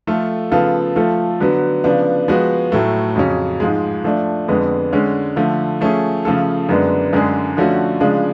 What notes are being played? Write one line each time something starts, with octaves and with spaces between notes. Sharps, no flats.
F3 A3 F4 A4
C#3 F3 B3 F4 A4
F3 A3 F4 A4
D3 F#3 B3
C#3 F3 B3 D4
F3 G#3 B3 F#4
A2 F#3 A3
F2 C#3 F#3 C#4
G#2 F3 G#3
F3 A3 D4
F2 D3 G#3 B3
D3 G#3 C#4
D3 F3 A3
F3 A3 C#4 G#4
C#3 F3 A3 F4 A4
F#2 D3 G#3 B3 D4
F#2 D3 G#3 D4 G#4
D3 F3 A3 C#4 F#4
C#3 F3 G#3 D4